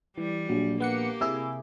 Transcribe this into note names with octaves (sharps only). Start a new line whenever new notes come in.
E3 G3
A#1 F#3
A#3 B3 G4 F#5 C#7
C3 E4 G#4 E6